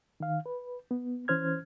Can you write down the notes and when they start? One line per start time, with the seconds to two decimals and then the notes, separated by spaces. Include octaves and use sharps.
0.20 D#3 F5
0.46 B4
0.91 B3
1.28 E3 C#4 C5 F6 G#6